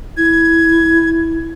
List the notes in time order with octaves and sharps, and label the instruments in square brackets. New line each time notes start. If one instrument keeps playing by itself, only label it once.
[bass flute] E4 [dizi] G#6